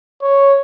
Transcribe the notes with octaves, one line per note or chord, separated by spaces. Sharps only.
C#5